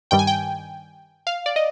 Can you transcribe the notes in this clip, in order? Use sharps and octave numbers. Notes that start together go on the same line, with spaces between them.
G2 D#3 G3 G5
G#5
G5
F5
D5
D#5